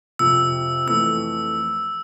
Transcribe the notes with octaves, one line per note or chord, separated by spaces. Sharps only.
F2 C3 F3 E6
F2 E3 A3 E6